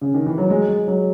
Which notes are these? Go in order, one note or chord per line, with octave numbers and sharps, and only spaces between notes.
C#3
D#3
E3
F#3
G#3
G#3
F#3